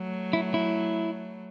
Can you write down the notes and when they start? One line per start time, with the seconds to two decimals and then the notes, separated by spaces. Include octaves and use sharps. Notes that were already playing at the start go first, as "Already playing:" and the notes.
Already playing: F#3 A3
0.33 E4
0.54 E4